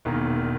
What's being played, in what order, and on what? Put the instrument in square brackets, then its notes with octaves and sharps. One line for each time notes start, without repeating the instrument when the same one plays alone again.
[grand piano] E1 E2 D#3 A#3